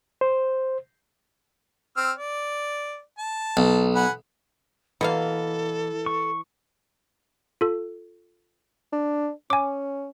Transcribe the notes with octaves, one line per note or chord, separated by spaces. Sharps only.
C5
C4 E6 F6
D5
A5
B1
F#5 G#5 B5
B2 E3 A#3 A4 F5
C#6
F4 A4
D4
C#4 G#5 D6